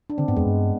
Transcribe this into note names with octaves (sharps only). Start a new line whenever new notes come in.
D4
D3 C4
G#2 B3
F2 G#3
G2